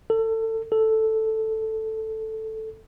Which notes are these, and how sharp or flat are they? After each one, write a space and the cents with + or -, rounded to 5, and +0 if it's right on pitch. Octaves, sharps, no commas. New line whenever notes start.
A4 +25
A4 +0